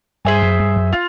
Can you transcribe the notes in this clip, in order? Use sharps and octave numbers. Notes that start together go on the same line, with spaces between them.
G2 G#4 C5 E5 G#5
F#2
G2
F#2
F4